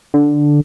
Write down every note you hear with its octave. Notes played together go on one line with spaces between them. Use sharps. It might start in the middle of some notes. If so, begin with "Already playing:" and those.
D3